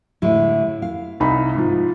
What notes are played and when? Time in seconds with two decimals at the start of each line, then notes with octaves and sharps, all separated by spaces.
0.22 A2 D3 G#3 E4
0.82 F5
1.20 C2 D#4 B5
1.55 G#2 F3